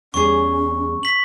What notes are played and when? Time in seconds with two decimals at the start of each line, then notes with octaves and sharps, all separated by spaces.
0.14 E2 G3 C#4 G#4 C#6
1.03 B6 F#7